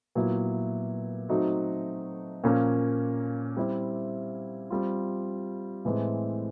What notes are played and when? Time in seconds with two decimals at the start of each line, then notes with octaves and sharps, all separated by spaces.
0.15 A#2 F#3 B3 E4
1.29 F#3 A3 C4 D#4 F#4
2.43 A#2 F3 A#3 C#4
3.57 G3 C4 E4
4.70 G3 C4 F4
5.85 A2 E3 G#3 C4